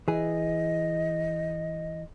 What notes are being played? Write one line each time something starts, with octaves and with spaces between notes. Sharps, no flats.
E3 G#4 D#5